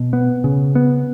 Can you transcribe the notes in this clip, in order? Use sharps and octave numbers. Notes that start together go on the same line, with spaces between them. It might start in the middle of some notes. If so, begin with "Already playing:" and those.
Already playing: B2
B3
C#3
B3